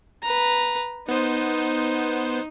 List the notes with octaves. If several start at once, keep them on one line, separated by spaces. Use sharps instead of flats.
B4 A#5
B3 D#4 C5